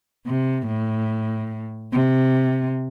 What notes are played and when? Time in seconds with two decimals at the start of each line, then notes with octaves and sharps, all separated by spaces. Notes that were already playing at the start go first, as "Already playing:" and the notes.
0.25 C3
0.65 A2
1.91 C3